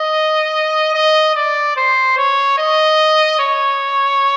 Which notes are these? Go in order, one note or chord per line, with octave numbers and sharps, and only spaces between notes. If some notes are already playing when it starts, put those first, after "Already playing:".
Already playing: D#5
D#5
D5
C5
C#5
D#5
C#5